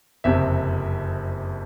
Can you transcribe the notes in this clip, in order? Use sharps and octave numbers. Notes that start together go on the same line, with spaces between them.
F#1 F2 C3 E5